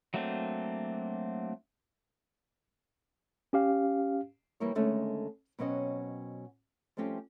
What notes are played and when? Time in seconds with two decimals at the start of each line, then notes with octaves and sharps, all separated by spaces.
0.14 F#3 A3 A#3 C4 D4
3.53 C#4 G4 F5
4.60 E3 G3 A#3 E4 A#4 C#5
4.75 D#2 D3 G#3 A3 C#4 D#4
5.59 B2 F#3 C4 C#4 D#5 F#5
6.97 F3 G3 A3 C4 C#4 G4